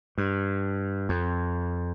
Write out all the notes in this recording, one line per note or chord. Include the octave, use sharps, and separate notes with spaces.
G2
F2